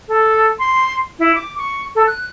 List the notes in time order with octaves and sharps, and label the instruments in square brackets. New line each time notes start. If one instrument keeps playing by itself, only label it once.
[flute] A4
C6
E4
D6
C#6
A4
F#6